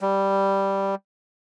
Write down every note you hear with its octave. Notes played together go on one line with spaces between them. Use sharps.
G3